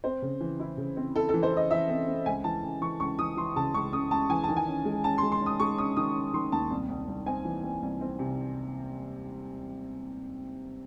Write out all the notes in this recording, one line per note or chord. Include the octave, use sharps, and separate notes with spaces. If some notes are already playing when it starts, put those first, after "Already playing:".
C4 C5
C#3
E3
E4
C#3
C4
E4 A4
A4
E3
C5
E4
D#5
E3 E5
C4
C4
C#2 G#5
E3 A5
C#2
E3 C#6
C#2 C#6
E3 D#6
E3 C6
C#3 A5
C#2 C#6
C#2 D#6
C#2 A5
E3 G#5
D#3 A5
G#5
C#4
G#3
C#4 A5
C6
G#3
C6
C#4
D#6
G#3 C#6
C#4 D#6
D#3 D#6
C#4
D#3 C6
D#2 A5
C2
C2
C2
C4 G#5
E3
C4
C2
C4
C3